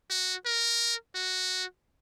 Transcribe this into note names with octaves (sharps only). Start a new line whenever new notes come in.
F#4
A#4
F#4